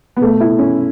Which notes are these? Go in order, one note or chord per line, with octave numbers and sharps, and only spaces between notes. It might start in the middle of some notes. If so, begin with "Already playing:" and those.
B3
B2 A3
E4
C#4